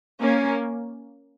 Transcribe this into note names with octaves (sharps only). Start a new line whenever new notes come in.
A#3 C#4